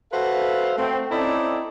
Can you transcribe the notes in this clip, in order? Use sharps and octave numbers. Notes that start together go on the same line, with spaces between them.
F#4 A4 B4 C5 E5 F5
A3 C4
C4 C#4 D#4 E4 A4 D5